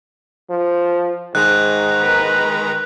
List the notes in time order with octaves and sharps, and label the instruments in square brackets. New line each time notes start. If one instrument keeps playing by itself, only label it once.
[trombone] F3
[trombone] G#2 [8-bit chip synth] D#3 G#3 A#5 [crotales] F#6
[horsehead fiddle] A#4 B4